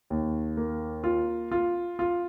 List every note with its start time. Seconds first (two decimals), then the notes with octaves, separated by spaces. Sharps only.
0.10 D#2
0.57 A#3
1.04 F4
1.51 F4
1.99 F4